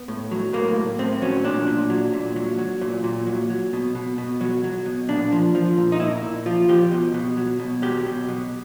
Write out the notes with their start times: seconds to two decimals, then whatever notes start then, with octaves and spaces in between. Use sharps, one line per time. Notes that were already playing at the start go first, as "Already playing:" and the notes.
Already playing: B3
0.08 A2
0.31 F#3
0.53 A2 A#3
0.76 A2
0.99 A2 C4
1.22 F#3 C#4
1.44 A#2 D4
1.68 A#2
1.90 F#3
2.14 A#2
2.36 F#3
2.58 F#3
2.82 A#2
3.04 A#2
3.27 F#3
3.50 F#3
3.73 B2
3.95 B2
4.18 B2
4.41 F#3
4.64 F#3
4.86 B2
5.09 A#2 D4
5.32 F3
5.55 F3
5.77 A#2
5.92 D#4
6.00 A#2 E4
6.23 A#2
6.46 F3 F4
6.69 F3 G4
6.91 B2
7.14 B2
7.37 F#3
7.60 B2
7.82 F#3 G4
8.06 B2
8.29 B2